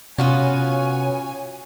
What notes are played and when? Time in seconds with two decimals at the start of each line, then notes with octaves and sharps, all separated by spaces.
0.18 C3 B3 C#4 F4 F#4 C#5 G#5